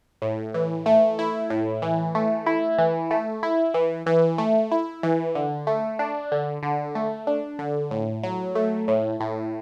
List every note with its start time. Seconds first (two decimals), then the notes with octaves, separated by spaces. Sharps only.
0.22 A2
0.54 E3
0.86 A3
1.19 E4
1.50 A2
1.82 E3
2.15 A3
2.47 E4
2.78 E3
3.11 A3
3.43 E4
3.74 E3
4.06 E3
4.38 A3
4.72 E4
5.03 E3
5.35 D3
5.67 A3
5.99 D4
6.32 D3
6.63 D3
6.95 A3
7.27 D4
7.59 D3
7.91 A2
8.23 F#3
8.55 A3
8.88 A2
9.20 A2